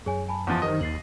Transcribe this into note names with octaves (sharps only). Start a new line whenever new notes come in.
F#2 G#4 C#5 G#5
G#5 A5 B5
E2 F3 F#5
D#3 G4 A#4 C5 D#5
D#2 A6 C7 F#7